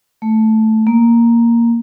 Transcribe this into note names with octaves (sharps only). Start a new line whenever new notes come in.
A3
A#3